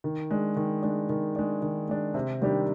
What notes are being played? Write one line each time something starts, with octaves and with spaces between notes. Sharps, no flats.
D#3
G#3 D4
D#3
G#3 D4
D#3
G#3 D4
D#3
G#3 D4
C3
D#3 G3 D4 G4